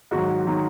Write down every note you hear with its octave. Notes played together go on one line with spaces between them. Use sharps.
G#2 D#3 F#3 F#4
D#3 F#3